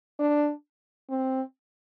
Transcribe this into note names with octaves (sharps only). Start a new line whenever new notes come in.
D4
C4